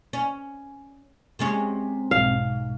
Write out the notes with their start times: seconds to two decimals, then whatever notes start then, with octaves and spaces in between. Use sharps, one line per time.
0.13 C#4
1.39 C3 G#3 C#4
2.11 B1 G#2 F5